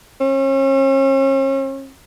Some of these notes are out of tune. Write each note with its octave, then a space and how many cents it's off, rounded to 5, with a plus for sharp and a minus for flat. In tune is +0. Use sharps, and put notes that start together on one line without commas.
C#4 -40